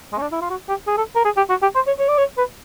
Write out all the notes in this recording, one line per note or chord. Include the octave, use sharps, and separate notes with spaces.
G#3
C#4
D4
E4
F4
F#4
G4
G#4
A4
A#4
G#4
G4
F#4
G4
C5
C#5
C#5
D5
C#5
B4